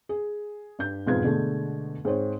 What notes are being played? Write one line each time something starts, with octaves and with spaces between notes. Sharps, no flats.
G#4
G2 G6
E1 F2 G#2 B4 F5 G#6
B2 D3 G#3 A3
G#2 C4 C5 C#5